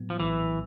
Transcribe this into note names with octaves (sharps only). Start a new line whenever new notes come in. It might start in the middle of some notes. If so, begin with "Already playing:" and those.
Already playing: A2 F#3 B3
F3
A#1 E3